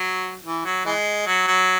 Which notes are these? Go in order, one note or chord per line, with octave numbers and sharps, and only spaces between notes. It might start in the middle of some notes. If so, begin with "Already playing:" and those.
Already playing: F#3
E3
F#3
E3 G#3
F#3
F#3